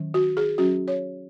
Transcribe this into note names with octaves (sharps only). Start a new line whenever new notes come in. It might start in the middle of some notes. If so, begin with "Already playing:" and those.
Already playing: D#3 F#3 C#4
F#4
G#4
F#3 C#4 F#4
C#5